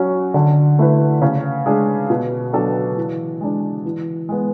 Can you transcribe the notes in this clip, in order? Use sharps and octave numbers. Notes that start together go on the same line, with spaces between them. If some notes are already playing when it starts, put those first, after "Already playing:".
Already playing: F#3 C#4 F#4
D3
A3 E4 B4
C#3
G#3 D4 G#4
B2
F#3 B3 D4 A4
E3
G#3 D4
E3
G#3 B3